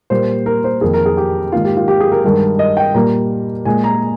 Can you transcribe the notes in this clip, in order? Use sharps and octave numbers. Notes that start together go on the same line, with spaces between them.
A#2 G3 A#3 C5
A#4
C5
F2 D#3 A#3 G#4
A#4
G#4
G4
G#2 D#3 A#3 F4
G4
F4
G4
G#4
A#4
G2 D#3 G#3 A#4
D#5
G5
A#2 G3 A#3 A#5
A#2 G#3 G#5
A#5